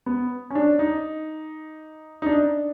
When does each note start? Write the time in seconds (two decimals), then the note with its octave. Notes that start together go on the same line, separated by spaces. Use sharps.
0.06 B3
0.50 C#4
0.55 D4
0.79 D#4
2.22 D#4
2.26 D4